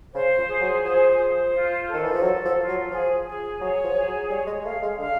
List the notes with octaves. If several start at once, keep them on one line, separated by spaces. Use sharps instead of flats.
C#3 C5
F3
G#4
F#3
F3 C5
C5
F4
A4
D#3
E3
F3
F#3 A4
F3
F4
F#3
F3 G#4
G#4
F#3 C#5
F3
G#4
F#3
G3 C#5
G#3
A3 F5
G#3
D3 F5